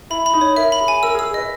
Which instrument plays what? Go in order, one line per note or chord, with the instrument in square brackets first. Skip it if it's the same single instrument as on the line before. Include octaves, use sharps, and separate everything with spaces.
[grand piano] E4 [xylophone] B5
[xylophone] B5
[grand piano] D#4
[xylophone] C#5
[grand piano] A#4 [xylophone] E5
[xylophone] B5
[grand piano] G#4
[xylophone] G#5
[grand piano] A#4 [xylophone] E6
[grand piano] G#4
[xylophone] E6
[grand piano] G#4
[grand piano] B4 [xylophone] D#5